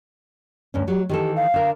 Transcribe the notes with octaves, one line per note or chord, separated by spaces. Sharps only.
D2 G2 C#4
F#3 G#3 G4
D#3 E3 G4 A4
F5
D3 A#4